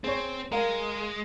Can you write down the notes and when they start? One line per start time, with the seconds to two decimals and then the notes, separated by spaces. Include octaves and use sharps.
0.04 C4 G#4 C#5
0.52 G#3 A#4 F5